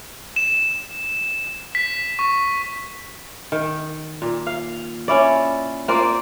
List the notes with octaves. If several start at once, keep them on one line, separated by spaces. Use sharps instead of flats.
E7
B6
C#6
D#3
A#2
F5
C#4 E4 D5
A#3 C4 F4 D5